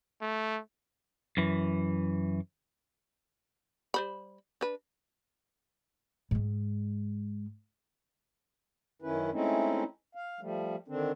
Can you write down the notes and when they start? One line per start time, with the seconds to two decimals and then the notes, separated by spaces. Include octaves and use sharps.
0.22 A3
1.37 F#2 E3
3.94 G3 C5 B5
4.61 D4 B4
6.31 G#2 G#3
9.02 F#2 D#3 C#4 E4 B4
9.32 G#3 A3 C4 C#4 D#4 E4
10.15 F5
10.41 F3 G3 A3
10.88 D3 D#3 C4 D4